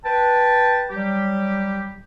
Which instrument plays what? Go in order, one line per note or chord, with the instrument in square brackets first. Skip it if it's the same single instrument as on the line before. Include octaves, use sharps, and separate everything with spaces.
[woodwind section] B4 G5 A5
F#3 G3 G4